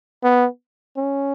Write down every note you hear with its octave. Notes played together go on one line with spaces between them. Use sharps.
B3
C#4